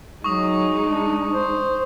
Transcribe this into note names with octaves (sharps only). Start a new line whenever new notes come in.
F#3 G#3 D#4 C#6 D#6
D4
C5